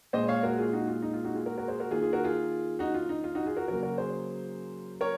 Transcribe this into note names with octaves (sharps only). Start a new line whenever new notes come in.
A#2 G#3 C5 D#5
C#5 F5
F#4 A#4
F4 G#4
D#4 F#4
F4
D#4
F4
D#4 F#4
F4 G#4
F#4 A#4
F#4 A#4
G#4 C5
F#4 A#4
D#3 A#3 F4 G#4
F4 G#4
F#4 A#4
F4 G#4
D#4 F#4
F4
D#4
F4
D#4 F#4
F4 G#4
F#4 A#4
C#3 F#3 A#3 F#4 A#4
F#4 A#4
G#4 C5
A#4 C#5